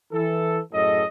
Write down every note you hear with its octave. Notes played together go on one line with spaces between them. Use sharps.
E3 A4
F#2 A2 G#4 A4 D#5